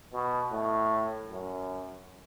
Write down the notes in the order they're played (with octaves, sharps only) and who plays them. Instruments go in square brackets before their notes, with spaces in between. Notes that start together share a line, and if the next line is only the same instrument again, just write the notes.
[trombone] B2
A2
F#2